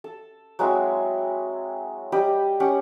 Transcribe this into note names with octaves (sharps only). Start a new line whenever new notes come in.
A4
F#3 G#3 C4 E4
G3 G4 D#5 B5
C#4 G4 F#5